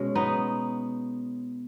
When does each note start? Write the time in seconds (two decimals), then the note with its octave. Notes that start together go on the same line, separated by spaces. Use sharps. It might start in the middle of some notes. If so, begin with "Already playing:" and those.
Already playing: B2 G#3 C#4
0.15 B3 D#4